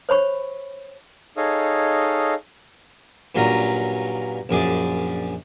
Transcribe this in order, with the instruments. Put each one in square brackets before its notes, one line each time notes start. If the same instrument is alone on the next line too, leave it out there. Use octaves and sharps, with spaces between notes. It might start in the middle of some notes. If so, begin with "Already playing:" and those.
[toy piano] C5 C#5 B5 C#6
[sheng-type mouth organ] D#4 G#4 A4 C#5 D#5 F5
[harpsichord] G2 A#2 F#3 C#4 A#5
A#1 F#2 G#4 D5